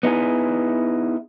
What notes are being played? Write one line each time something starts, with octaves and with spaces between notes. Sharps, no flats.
B3 D#4 E4 G#4